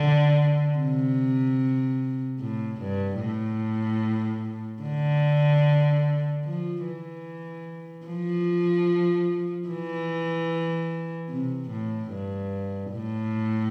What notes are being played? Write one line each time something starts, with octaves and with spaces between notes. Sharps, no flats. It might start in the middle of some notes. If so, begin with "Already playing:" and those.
Already playing: D3
C3
A2
G2
A2
D3
F3
E3
F3
E3
C3
A2
G2
A2